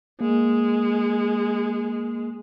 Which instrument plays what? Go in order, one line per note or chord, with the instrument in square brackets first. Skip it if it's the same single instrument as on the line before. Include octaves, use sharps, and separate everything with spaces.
[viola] G#3 [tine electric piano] A#3